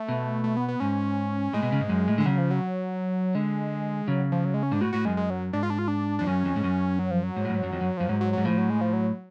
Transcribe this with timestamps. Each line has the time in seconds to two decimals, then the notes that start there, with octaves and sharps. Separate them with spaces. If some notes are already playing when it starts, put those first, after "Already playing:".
Already playing: A3
0.09 B2
0.44 A3
0.57 B3
0.68 B3
0.80 G#2 C#4
1.53 A2 G#3
1.63 B2
1.72 C#3
1.80 G#2
1.89 F#2
2.08 A2
2.18 D3 G#3
2.26 C#3 F#3
2.38 F3
2.51 F#3
3.35 D3 G#3
4.08 C#3 F#3
4.32 F3
4.45 F#3
4.54 G#3
4.63 C#4
4.71 G#2 D4
4.81 A2 F#4
4.93 A2 F#4
5.05 F#2 G#3
5.17 G#3
5.30 F#3
5.53 G#2 D4
5.63 F4
5.70 D4
5.79 F4
5.88 D4
6.19 F2 D4
6.27 F#2 C#4
6.45 F2
6.56 G#2
6.64 F#2
6.99 F#3
7.11 F3
7.23 F#3
7.36 G#2
7.45 A2
7.50 F#2
7.54 G#2
7.63 F#2
7.73 F2
7.81 F#2
7.97 F#2 F3
8.09 G#2 F#3
8.21 F#3
8.33 G#2 F#3
8.45 A2 F3
8.58 F#3
8.70 G#3
8.81 F3
8.93 F#3